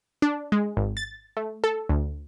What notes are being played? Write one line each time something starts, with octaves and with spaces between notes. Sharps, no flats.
D4
G#3
G#1
A6
A3
A4
D2